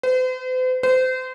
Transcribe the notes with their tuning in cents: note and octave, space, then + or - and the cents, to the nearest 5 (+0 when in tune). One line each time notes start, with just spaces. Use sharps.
C5 -45
C5 -30